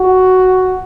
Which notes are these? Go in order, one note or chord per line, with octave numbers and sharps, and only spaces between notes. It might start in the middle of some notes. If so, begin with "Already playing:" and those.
Already playing: F#4